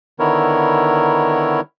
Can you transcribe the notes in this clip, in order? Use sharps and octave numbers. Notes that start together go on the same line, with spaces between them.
D3 D#3 B3 E4 A#4 C#5